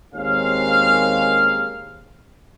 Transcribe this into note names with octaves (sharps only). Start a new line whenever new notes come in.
D#2 G#3 A#3 C4 C#4 F5